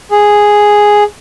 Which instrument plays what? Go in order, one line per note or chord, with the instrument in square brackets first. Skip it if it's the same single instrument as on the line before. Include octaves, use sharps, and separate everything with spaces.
[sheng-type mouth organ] G#4